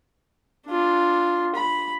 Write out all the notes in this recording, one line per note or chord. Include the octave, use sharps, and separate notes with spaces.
D4 F4
B5